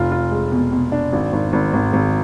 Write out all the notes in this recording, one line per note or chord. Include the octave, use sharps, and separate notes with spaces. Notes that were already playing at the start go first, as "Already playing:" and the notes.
Already playing: F1 F4
F4
G#3
B2
B2
D4
G#1
G#1
G#1
G#1
G#1